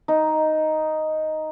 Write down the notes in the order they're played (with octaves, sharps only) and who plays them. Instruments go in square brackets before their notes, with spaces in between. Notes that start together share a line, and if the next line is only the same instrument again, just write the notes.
[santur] D#4